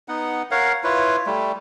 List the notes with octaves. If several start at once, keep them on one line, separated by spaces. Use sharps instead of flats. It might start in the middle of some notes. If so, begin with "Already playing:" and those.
B3 D#4 F#5
A#4 C#5 F5 F#5
E4 F4 B4 C#5
G3 A3